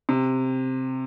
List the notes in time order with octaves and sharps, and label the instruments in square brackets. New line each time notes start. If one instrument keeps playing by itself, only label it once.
[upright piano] C3